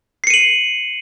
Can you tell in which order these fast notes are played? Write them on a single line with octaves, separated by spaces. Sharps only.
C7 C#7 D#7 F#7